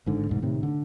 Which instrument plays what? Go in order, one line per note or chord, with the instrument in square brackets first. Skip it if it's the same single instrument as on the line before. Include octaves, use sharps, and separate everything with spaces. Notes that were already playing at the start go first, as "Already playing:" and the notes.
[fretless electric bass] G#1 G#2 D3
E1 C2 G#2
A2 C3 D#3
D3